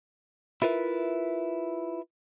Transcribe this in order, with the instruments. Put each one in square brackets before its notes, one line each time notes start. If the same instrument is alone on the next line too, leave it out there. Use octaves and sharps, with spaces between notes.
[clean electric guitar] E4 F4 A#4 B4 E5